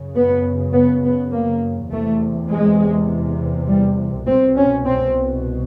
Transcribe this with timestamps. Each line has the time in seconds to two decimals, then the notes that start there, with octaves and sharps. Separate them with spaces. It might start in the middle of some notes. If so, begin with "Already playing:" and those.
Already playing: F#2 C#3
0.15 B3
0.74 B3
1.03 B3
1.32 A#3
1.91 E2 C3 A3
2.50 G#3
3.68 G3
4.26 C2 B2 C4
4.56 C#4
4.86 C4